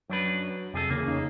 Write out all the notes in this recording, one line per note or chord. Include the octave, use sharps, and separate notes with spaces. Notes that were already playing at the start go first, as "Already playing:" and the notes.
F#2 F#3 D4 B4
F2 C3 G#4 A4
E2 C#3 A#3
D#4